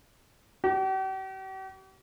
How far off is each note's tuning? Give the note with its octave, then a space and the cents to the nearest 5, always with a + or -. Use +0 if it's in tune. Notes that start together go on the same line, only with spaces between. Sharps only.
G4 -45